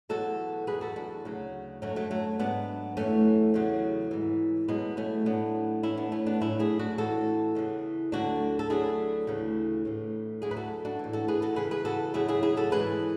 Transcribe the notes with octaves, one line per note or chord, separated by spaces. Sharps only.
E2 B2 F#3 F#4 A4
E2 B2 F#3 G#4 B4
F#4 A4
D4 F#4
D2 C#3 F#3
F#2 D3 F#3 A3 C#4
F#3 A3
F#3 A3
G#2 F#3 B3 D4
F#2 E3 A3 C#4
E2 C#3 F#3
G#2 E3
E2 B2 F#3 G#3 B3
A3 C#4
A2 F#3 B3 D4
A2 E3 C#4 E4
B3 D4
A3 C#4
B3 D4
A2 F#3 C#4 E4
E4 G#4
D4 F#4
A2 E3 F#4 A4
E2 C#3 E3
D2 D3 F#3 D4 F#4
A4
D2 D3 F#3 E4 G#4
D2 C#3 E3
A2 E3
D2 D3 F#3 E4 G#4
B4
F#4 A4
D4 F#4
A2 E3
F#4 A4
G#4 B4
F#4 A4
E2 C#3 E3 G#4 B4
G#4 B4
F#4 A4
E2 C#3 F#3 E4 G#4
E4 G#4
E4 G#4
F#4 A4
G#2 E3 G#4 B4